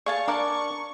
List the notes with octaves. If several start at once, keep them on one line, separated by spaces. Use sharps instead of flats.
G#4 D5 F5 A5 C#6
D4 A#4 D5 A#5